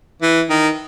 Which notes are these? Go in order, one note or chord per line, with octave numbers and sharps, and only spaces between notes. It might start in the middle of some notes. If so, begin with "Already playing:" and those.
E3
D#3